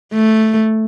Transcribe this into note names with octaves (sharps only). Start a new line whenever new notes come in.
A3